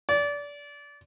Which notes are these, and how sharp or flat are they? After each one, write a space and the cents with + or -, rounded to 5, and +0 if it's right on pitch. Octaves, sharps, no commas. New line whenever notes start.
D5 -25